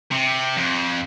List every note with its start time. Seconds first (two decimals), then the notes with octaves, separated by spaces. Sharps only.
0.11 C3
0.57 F2